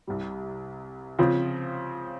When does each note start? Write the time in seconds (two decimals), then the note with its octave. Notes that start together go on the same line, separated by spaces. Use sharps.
0.07 C2 C3 G3
1.19 C#3 F3 C4 F4